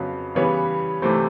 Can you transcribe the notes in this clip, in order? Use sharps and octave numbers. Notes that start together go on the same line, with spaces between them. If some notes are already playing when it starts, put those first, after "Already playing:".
Already playing: F2 C#3 F#3 B3
C#3 E3 G3 B3 B4 C#5
C3 E3 A3 C4